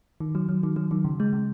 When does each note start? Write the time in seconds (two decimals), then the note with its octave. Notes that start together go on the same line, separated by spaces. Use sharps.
0.20 D#3
0.35 F#3
0.49 F#3
0.63 D#3
0.76 F#3
0.91 D#3
1.04 C#3
1.20 G#3
1.33 C#3